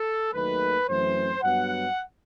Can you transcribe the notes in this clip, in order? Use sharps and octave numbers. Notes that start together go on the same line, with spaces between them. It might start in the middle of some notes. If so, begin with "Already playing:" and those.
Already playing: A4
D#2 D#3 F#3 A3 B4
F#2 E3 A3 C4 C5
G2 F#3 B3 F#5